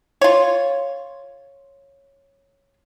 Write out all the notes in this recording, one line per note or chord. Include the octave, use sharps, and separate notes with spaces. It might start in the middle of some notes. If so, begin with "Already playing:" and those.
F4 C#5